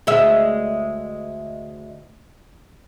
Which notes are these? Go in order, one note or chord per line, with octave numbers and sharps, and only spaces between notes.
D2 G#3 E5